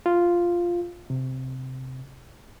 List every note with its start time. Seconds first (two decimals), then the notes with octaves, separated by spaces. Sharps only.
0.06 F4
1.10 C3